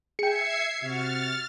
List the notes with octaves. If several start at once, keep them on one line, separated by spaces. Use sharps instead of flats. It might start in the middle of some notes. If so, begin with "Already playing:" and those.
G#4 E5 G5 G#6 C7 C#7
C3 F#4 F6 A6